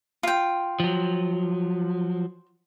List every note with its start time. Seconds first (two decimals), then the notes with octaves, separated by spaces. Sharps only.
0.23 F4 G5
0.80 F3 F#3